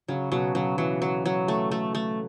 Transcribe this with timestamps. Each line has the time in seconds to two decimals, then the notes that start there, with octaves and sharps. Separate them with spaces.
0.08 C#3 F#3
0.32 B2 F#3
0.55 C#3 F#3
0.78 E3 F#3
1.02 F#3
1.26 F#3
1.48 A3
1.71 A3
1.95 A3